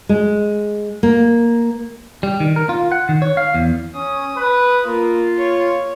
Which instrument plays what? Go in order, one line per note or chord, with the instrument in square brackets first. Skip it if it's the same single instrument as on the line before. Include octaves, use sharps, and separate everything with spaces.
[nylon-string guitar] G#3
A#3
[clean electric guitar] G3
D#3
A#4
F4
F#5
D#3
C#5
F5
E2
[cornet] C#4 [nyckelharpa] D#6
[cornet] B4
[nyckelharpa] A#3 [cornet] F4
[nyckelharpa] C#5